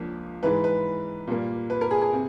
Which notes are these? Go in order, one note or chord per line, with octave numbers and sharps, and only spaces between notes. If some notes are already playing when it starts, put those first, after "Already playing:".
Already playing: C#2 F3 A#3 D4
G#2 E3 G#3 B4
B4
A#2 G3 A#3
B4
A#4
G#4
G#4
C3